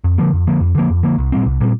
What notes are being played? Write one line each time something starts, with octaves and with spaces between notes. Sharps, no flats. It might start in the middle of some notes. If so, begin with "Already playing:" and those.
F2
D3 F3 A#3
F2
D3 F3 A#3
F2
D3 F3 A#3
F2
D3 F3 A#3
C2
A#2 G3 C4
C2
A#2 G3 C4